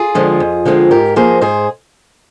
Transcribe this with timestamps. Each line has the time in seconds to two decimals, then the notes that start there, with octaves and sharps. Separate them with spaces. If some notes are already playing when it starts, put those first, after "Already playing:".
Already playing: F4 G#4
0.15 D3 F3 G#3 C4
0.40 F2
0.65 D3 F3 G#3 C4
0.91 G#2 G4 A#4
1.16 F3 A#3 G#4 C5
1.41 G#2 G#4 C5